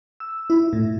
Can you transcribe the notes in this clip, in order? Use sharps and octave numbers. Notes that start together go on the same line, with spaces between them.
E6
E4
A2